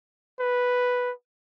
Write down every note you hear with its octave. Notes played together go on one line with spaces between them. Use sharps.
B4